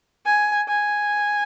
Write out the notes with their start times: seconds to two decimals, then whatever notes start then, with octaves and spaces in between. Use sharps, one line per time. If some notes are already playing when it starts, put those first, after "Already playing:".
0.25 G#5
0.68 G#5